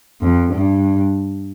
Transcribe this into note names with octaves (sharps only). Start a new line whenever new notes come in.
F2
G2